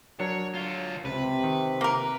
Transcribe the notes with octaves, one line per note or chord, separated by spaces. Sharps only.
F#3 D4 A#4 C#5
F4 C#5
C#2 C3 B4
D#3
A#3 A#4